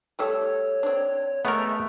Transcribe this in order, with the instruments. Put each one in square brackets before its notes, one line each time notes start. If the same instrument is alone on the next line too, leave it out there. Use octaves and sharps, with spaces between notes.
[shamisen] G3 A3 A4 [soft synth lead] C#5
[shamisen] C4 D4
[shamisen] G#3 [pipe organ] A3 [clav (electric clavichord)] B3 A#4